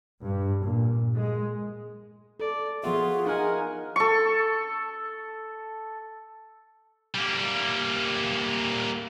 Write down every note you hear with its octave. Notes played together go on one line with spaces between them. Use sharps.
G2
A#2
G#3
A4 D5
F3 B3 F4 F#4 G#4 E5 C6
D#4 A#4 F5 F#5 G#5
A4 C#6
G3 A#3